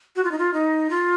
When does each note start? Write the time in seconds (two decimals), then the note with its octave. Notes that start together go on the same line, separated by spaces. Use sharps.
0.16 F#4
0.24 F4
0.31 D#4
0.38 F4
0.54 D#4
0.90 F4